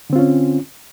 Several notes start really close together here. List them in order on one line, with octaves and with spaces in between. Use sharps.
D3 C4 F4 C#4